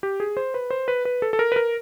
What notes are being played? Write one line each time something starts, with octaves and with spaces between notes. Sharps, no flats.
G4
G#4
C5
B4
C5
B4
B4
A4
A4
A#4
B4
A#4